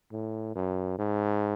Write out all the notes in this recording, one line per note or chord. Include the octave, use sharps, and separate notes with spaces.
A2
F#2
G#2